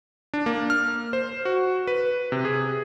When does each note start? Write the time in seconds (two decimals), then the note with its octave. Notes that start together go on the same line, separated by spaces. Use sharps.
0.34 D4
0.46 A#3
0.70 F6
1.13 C5
1.45 F#4
1.87 B4
2.32 C3
2.45 G#4